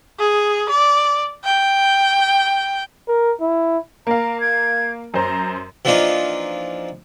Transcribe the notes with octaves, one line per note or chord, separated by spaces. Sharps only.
G#4
D5
G5
A#4
E4
A#3 F5 A#5
G#6
F#2 C5 A#5
E3 F3 A#3 D4 D#4 F4